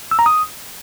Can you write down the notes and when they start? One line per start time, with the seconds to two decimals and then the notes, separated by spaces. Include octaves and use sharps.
0.11 E6
0.19 A#5
0.26 D#6